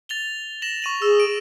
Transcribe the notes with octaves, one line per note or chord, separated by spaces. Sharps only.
A6 F7 G7
A#6 E7 F#7
C#6 D#7 F#7
G#4 E6
D7